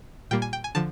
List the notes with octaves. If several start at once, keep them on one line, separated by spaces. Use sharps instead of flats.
A#2 G3 A#3 G5
G#5
G5
G#5
D3 F3 A5